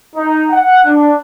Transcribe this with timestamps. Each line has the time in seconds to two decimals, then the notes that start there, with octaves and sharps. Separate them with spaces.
0.16 D#4
0.50 F#5
0.86 D4